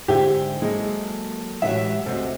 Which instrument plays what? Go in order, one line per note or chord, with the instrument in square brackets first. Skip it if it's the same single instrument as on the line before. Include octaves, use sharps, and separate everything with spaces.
[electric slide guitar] G#2 D3 [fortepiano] G4 [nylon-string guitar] C5 E5 G#5
[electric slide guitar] F#3 A#3 A4 [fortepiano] G#3
[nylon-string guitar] A2 E3 F#3 [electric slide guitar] G#3 G4 [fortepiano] E5
[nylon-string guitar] D2 C3 [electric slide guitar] A4 C5 D#5